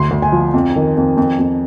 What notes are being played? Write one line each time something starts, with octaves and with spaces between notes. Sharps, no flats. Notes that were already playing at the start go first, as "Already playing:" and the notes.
Already playing: D2 C6
D2
G#5
F3
F2
D#3
F2
F2
F2